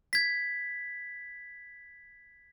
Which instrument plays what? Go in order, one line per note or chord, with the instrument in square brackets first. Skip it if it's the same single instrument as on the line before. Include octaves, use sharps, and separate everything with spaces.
[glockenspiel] G#6 B6